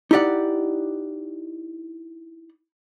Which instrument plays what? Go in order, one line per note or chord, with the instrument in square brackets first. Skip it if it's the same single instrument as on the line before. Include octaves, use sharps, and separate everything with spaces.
[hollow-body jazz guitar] D#4 E4 G4 D5 F#5